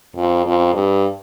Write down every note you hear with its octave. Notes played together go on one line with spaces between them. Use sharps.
F2
F2
G2